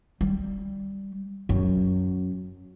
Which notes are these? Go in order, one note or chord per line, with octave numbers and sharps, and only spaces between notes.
G3
F#2